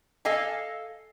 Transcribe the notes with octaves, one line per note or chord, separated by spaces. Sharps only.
A4 D#5 F5 G#5